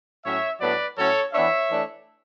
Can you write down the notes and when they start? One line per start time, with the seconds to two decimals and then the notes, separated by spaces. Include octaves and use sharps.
0.24 A2 F#3 C#4 C#5 E5
0.60 A2 F#3 B3 D4 B4 D5
0.97 A2 F#3 C#4 A4 C#5
1.33 E3 B3 D4 C#5 E5
1.70 E3 A3 D4